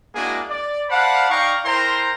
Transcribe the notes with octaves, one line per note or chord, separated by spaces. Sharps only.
G#3 A#3 D4 E4 F#4 G#4
D5
C5 D5 F5 F#5 A5 B5
D#4 D5 F5 G5 A#5 C#6
E4 A#4 C5 G5 A#5 C6